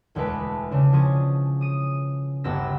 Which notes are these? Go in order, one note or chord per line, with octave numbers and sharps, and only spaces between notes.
E1 D2 G#3 A3 B4 D7
C#3 D4
F3 C#4 G#4
D#6 D#7
G1 D2 B3 G4 E6 A#6